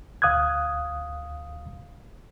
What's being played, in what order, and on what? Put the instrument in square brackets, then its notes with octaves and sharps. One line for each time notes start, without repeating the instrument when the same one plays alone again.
[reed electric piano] D2 F5 D#6 F#6 G#6